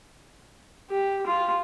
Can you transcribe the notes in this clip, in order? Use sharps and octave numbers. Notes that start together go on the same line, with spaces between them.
G4
F4